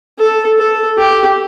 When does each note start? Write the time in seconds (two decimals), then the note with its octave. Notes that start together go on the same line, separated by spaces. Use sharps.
0.19 A4
0.58 A4
0.98 G4